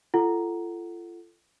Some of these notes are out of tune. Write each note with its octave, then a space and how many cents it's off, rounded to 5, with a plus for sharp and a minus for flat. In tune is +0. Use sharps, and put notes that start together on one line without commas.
F4 -30 A4 +0 F#5 +0